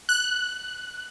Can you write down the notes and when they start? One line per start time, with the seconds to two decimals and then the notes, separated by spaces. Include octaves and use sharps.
0.09 F#6